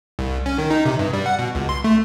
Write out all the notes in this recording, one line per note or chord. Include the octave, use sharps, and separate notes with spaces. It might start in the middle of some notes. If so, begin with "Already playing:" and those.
C2
C#4
D#3
D#4
C3
G2
G3
F#5
B2
C#2
C6
A3